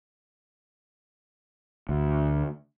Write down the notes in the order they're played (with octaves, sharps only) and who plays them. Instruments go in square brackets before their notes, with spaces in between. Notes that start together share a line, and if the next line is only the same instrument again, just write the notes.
[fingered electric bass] D2